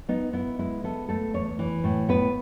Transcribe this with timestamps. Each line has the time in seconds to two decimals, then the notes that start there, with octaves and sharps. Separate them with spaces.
0.09 B3 D#4
0.33 B3 E4
0.59 G#3 E4
0.84 B3 A4
1.09 A3 A4
1.34 E2 C#5
1.59 E3
1.84 A2
2.09 B3 B4